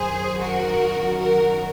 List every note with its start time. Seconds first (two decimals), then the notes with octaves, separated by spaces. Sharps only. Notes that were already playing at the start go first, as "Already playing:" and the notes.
Already playing: F#2 D#3 F#3 G#4 C5
0.40 F#4 A#4
1.20 F#4 A#4